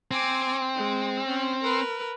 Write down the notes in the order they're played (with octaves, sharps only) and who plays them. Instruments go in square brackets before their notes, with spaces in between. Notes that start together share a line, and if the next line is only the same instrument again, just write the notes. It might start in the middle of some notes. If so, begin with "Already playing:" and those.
[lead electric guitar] C4 [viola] G#5 D6
[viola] G#3
C#4
A#4 B4